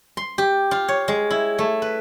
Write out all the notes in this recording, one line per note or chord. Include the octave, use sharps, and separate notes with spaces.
C6
G4
F4
C#5
G#3
E4
A3
B4